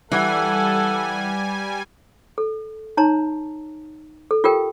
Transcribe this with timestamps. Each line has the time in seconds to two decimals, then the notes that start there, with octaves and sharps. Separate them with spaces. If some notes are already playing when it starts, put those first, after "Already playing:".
0.12 E3 G3 A4 F#5 G#5
2.38 A4
2.97 D#4 C#5 A5 A#5 C6
4.31 A4
4.44 F4 G4 A4 A#4 G5